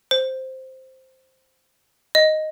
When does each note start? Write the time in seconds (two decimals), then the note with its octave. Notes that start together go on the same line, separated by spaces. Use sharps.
0.11 C5
2.15 D#5